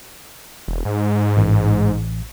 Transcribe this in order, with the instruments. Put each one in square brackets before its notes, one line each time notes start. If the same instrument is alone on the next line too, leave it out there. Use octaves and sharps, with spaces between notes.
[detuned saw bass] E1
G#2
[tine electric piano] A1